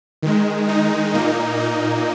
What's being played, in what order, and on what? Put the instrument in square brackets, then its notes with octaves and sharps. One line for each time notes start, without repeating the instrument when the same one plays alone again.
[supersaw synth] D#3 G#3
D#4
A#2 A#3 D#4
D#4